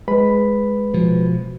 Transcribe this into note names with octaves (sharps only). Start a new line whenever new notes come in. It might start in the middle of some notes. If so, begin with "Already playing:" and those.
G#3 B4 B5
B2 F3